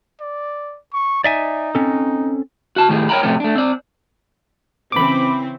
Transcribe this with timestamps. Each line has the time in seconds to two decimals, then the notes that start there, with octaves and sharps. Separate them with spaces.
0.21 D5
0.93 C#6
1.24 D#4 D5 E5 G#5
1.75 C4 C#4 A4
2.76 F#4 A5
2.89 A2 D#3 A3 G4 G#4
3.09 A#4 C#5 E5 G5 A#5 B5
3.23 A2 C3 F3 A3 C#4 G4
3.40 A3 D4
3.56 C4 D5
4.92 C#3 E3 C4 B5 D6